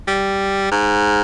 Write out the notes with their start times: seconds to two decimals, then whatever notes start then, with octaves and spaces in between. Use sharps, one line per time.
0.08 G3
0.71 G#2